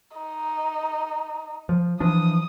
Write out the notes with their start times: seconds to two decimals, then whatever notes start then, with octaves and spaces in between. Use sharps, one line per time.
0.17 D#4
1.69 F3
2.00 E3 F3 D4 D#6